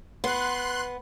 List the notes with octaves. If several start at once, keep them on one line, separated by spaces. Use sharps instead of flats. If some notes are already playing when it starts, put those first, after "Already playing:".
B3 C6 F#6